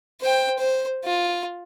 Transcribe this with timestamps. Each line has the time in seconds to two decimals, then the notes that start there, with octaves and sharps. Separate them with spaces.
0.21 C5 G5
0.59 C5
1.04 F4